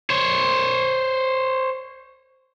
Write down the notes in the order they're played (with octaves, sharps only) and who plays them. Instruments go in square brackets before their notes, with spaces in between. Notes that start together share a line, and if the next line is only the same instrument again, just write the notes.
[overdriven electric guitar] C5 C#5